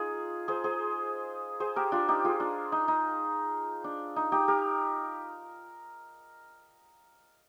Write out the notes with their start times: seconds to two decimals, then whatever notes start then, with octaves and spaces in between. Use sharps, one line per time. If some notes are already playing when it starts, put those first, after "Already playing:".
Already playing: D#4 F4 G#4
0.48 G#4 C5
0.64 G#4 C5
1.60 G#4 C5
1.76 G4 A#4
1.92 D4 F4
2.08 D#4 G4
2.25 F4 G#4
2.40 D4
2.72 D#4
2.88 D#4
3.84 D4
4.16 D#4
4.32 D#4 G4
4.48 G4 A#4